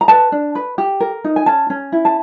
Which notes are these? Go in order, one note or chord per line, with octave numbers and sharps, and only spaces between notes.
A#5
B4 A5
D4
B4
G4
A#4
D#4
G#5
C#4 A5
C#4
E4
A5